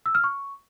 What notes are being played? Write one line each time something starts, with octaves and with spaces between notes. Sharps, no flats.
E6
F6
C#6